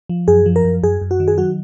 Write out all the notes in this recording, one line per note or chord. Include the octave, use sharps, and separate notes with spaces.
F3
F#2 G#4
F3
A#4
F#2
F#2 G#4
F#2
F#4
D#3
G#4
F#3 F#4